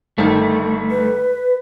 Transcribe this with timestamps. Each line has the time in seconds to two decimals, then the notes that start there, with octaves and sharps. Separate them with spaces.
0.18 G1 D#3 A3
0.90 B4